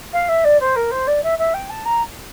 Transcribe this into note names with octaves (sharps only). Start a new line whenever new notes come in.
F5
E5
D5
C5
A#4
C5
D5
E5
E5
G5
A5
A#5